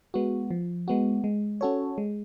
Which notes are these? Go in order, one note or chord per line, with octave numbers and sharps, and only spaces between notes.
G#3 B3 F#4
F3
G#3 B3 F#4
G#3
C#4 F#4 A4 C#5
G#3